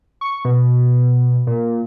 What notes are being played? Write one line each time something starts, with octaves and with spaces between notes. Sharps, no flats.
C#6
B2
A#2